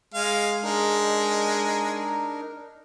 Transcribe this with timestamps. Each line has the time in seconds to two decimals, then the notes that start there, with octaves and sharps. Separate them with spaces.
0.14 G#3 F5
0.63 G#3 D4 D#4 A#4